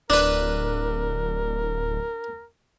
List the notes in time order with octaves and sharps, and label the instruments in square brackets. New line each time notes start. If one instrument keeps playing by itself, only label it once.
[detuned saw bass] D1 [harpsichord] D4 B4 [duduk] A#4